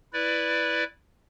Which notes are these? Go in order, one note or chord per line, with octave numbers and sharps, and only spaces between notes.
E4 B4 D5